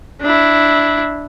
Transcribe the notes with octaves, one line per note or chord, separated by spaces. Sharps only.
D4 E4